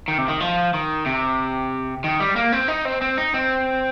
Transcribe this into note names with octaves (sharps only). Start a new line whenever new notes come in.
D#3
C3
D#3
F3
D#3
C3
D#3
G3
A#3
C4
D#4
C4
C4
D#4
C4